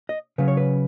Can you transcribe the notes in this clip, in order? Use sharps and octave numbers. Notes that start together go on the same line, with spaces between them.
D#5
C#3 F#3 C#4 B4
C#5
B4